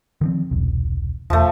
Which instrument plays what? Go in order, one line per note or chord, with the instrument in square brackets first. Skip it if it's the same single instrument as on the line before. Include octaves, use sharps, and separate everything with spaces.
[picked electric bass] D#3 F3 C4
E1 C2
[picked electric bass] E1 E2 [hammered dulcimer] F3 A3